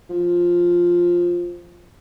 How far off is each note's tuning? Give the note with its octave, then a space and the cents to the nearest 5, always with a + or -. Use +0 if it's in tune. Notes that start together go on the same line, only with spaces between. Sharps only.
F3 +5